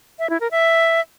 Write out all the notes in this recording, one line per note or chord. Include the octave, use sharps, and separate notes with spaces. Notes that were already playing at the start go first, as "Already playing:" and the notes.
E5
E4
A#4
E5